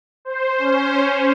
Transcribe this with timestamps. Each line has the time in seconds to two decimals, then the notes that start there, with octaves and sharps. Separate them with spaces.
0.25 C5
0.58 C#4
0.92 C#4